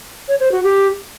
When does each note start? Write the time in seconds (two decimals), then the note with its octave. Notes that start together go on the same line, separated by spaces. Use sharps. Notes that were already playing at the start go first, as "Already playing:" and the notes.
0.28 C#5
0.40 C5
0.52 F#4
0.63 G4